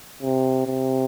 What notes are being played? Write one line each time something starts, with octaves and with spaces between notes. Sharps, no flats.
C3
C3